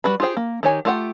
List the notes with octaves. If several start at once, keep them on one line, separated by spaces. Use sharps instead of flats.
G3 F#4 B4 B5
F4 G4 G#4 C5 G5
A#3
D#3 G4 C#5 G#5
A3 F4 G4 F#5 G5